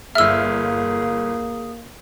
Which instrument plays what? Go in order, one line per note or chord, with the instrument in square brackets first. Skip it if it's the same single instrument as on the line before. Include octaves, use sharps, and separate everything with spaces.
[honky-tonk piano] G1 F6 [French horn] A#3 [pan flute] G#4 [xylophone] E5 E6